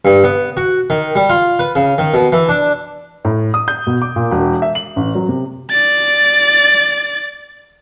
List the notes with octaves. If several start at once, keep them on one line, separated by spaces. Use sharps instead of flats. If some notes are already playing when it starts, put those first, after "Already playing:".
G2
B3
F#4
D#3
G3
F4
B4
C#3
D#3
B2
E3
D4
A2
D#6
G6
B2
D6
A#2
E1
E5
F#7
A1
F#3
C3
D5 A6